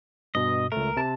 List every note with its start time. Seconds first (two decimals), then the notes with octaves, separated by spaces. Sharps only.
0.35 G2 B2 D#5
0.72 C#2 A3 A#4
0.97 C3 A5